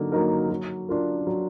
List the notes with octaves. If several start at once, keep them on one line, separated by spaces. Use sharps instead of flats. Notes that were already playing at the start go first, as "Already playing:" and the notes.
Already playing: D3 F#3 A#3 D#4
F#3 A#3 D#4 A#4
F#3
D4 F4 A#4
F#3